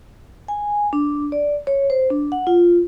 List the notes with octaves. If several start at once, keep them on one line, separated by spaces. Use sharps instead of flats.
G#5
D4
D5
C#5
C5
D4
F#5
F4